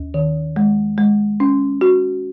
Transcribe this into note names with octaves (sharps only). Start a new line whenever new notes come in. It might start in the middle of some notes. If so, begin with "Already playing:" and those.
Already playing: D#2
D#3
G#3
G#3
C#4
F#4